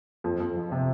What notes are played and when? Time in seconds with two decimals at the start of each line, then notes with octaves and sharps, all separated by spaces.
0.24 F2
0.40 F2
0.56 F3
0.72 C3